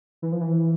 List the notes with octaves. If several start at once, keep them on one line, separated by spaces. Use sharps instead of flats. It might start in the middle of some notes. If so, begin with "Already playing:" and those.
E3
F3
E3